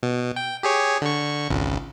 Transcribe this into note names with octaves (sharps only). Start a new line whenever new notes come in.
B2
G5
G4 G#4 C#5
D3 C#6
G#1 C#2